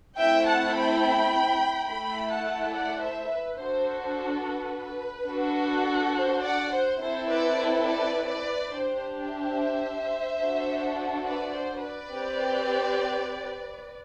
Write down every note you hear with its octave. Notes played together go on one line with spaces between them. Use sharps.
A3 C4 E4 E5 G5
F#5 A5
G5 B5
A3 E4 A4 G5 B5
F#5 A5
D5 F#5
C5 E5
B4
D4 F#4 A4 C5
C5
B4
D4 F#4 A4
C5
D5 F#5
C5
C4 E4 A4 C5
B4 D5
B4
B4 D5
B4 D5
D4 G4 C5
C5 E5
D4 F#4 A4
B4 D5
C5
B4 D5
C4 G4